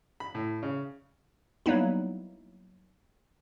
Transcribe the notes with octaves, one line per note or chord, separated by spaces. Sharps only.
B5
A2
C#3
F#3 G3 A#3 B3 D#4 E4